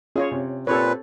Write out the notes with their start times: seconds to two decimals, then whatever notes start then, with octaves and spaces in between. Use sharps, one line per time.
0.16 C#4 F4 G#4 C#5
0.31 C3
0.67 A#2 C4 G4 A4 B4 C#5